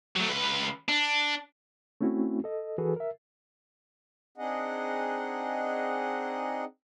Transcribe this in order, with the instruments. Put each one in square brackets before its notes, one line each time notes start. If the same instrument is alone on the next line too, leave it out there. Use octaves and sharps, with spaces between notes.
[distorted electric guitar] F#3 A3
C#2 B4
D4
[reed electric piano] A3 C4 C#4 E4 F#4
A4 D#5
E3 F#4 G#4 A4 B4
A#4 E5
[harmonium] C4 D4 D#4 G#4 D#5 F#5